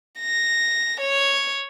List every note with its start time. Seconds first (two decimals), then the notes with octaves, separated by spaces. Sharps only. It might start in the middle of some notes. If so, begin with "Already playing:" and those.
0.20 A#6
1.01 C#5